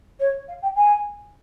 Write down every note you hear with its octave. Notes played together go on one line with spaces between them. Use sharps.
C#5
F5
G5
G#5